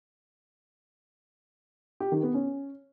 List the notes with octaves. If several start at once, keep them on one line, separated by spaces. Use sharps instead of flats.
G4
D#3
B3
C#4